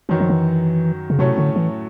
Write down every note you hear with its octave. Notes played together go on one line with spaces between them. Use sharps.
F#2 D#3 E3 F#3
F3
E3
C#3
A2 C3 F#3 A3 C#4
D3
E3